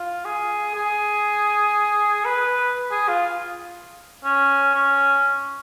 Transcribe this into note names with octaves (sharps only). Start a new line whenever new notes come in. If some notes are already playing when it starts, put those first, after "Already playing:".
Already playing: F4
G#4
G#4
B4
G#4
F4
C#4
C#4